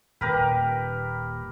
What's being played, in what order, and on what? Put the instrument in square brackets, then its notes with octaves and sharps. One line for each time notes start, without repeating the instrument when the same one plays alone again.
[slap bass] D#1 A#2 [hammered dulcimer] G4 A#4 B4